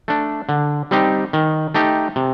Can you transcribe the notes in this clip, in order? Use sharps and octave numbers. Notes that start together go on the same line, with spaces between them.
A3 D4
D3
G3 C4 D#4 G4
D#3
A3 D#4 G4
C3